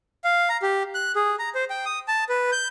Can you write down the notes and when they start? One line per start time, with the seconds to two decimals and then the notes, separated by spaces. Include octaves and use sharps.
0.24 F5
0.49 A#5
0.62 G4
0.94 F#6
1.16 G#4
1.39 A#5
1.55 C5
1.70 G5
1.85 D#6
2.08 A5
2.29 B4
2.52 G6